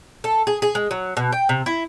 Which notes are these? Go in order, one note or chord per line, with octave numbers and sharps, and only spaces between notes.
A4
G#4
G#4
G#3
F#3
B2
G5
C3
E4